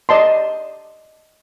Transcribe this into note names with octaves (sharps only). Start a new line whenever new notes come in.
D5 D#5 A5 C6